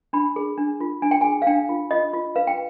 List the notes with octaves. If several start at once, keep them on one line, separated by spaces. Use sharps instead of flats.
D4 B5
G#4
D4
F4
D4 G#5
G5
G#4 G#5
F5
D4 G5
F4
F4 D#5
F4
B4 F5
G5